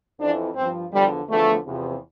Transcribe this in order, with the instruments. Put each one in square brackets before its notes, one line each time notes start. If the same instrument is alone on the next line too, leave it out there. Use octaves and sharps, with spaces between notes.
[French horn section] F2 E3 D4
G2 F3 C4
E2 D3 F3 G3
E2 D3 F3 A3
E2 C3 F3